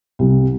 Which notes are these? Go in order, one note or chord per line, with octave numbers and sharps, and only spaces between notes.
C2